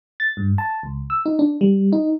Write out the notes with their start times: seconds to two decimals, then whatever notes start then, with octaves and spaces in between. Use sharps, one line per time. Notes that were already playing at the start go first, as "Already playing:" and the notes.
0.20 A6
0.37 G2
0.58 A5
0.83 C#2
1.10 E6
1.26 D#4
1.39 D4
1.61 G3
1.93 D#4